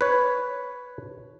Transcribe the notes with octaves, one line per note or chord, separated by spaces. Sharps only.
B4 C#5